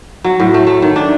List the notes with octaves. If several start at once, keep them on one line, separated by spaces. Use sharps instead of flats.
F#3
A2
A3
A3
D#3
D4